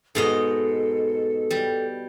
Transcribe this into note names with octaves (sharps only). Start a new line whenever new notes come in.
G#2 B2 A4 D#5
G3